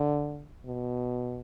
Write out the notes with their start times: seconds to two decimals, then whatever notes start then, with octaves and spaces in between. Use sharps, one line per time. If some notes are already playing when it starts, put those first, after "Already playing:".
Already playing: D3
0.65 B2